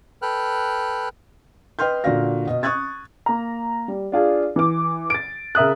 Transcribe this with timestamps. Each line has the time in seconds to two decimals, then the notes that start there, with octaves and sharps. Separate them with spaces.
0.22 A4 B4 G5 F6 F#6
1.79 B4 D#5 G5 C6 F6 G6
2.04 A#2 D3 F#4 D5 F5 A#6
2.47 B2 D#5
2.63 C#6 D#6 F#6 G#6 A6
3.26 A#3 A#5
3.88 G3
4.12 D4 F4 G#4
4.56 E3 D6
5.10 A6 D7
5.55 C#3 A#4 E5 D#6 F#6